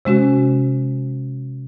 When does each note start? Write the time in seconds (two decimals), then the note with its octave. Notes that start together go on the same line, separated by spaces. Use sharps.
0.05 C3 G#3 C#4 F#4